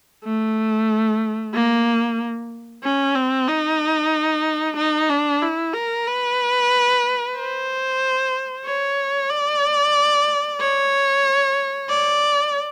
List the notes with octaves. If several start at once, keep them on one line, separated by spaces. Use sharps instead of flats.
A3
A#3
C#4
C4
D#4
D#4
D4
E4
A#4
B4
C5
C#5
D5
C#5
D5